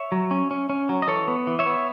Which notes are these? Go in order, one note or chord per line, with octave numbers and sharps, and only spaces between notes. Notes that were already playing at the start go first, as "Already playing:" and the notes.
Already playing: C#5 E5
F#3
C#4
C#4
C#4
F#3
D#5
E3 A4 C#5
B3
E3
C#5 E5
B3